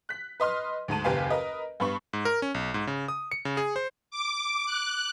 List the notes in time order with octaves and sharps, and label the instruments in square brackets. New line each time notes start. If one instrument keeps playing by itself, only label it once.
[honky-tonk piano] F#6 B6
B4 D#5 C6 F6
D2 G#2 A5 D#7
F#1 D#2 G4 B4 F5 G#5
A#4 B4 D#5
G2 B3 B5 C#6
[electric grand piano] G#2
A#4
C#4
B1
G#2
C#3
D#6
C#7
C#3
G#4
C5
[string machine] D6
F#6